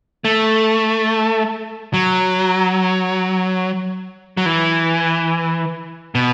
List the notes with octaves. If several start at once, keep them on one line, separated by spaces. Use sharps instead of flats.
A3
F#3
F#3
E3
B2